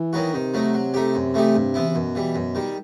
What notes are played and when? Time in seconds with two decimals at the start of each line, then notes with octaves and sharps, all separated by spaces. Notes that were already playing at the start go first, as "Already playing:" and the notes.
Already playing: E3
0.13 D#3 F#3 B3 F#4
0.34 C3 D#3
0.54 F#3 A3 D#4
0.74 F#3
0.94 A3 D#4 G4
1.15 F#2
1.34 E3 A3 D#4 G4
1.55 G2
1.74 E3 B3 E4
1.89 C3
1.95 F#2 B2
2.15 E3 G3
2.35 F#2
2.55 D#3 G3